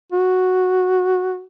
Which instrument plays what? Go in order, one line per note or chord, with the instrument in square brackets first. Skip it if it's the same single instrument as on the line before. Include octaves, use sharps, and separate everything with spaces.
[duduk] F#4